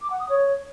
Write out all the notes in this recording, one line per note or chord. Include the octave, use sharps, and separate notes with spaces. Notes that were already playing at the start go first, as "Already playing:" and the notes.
D6
F#5
D#6
C#5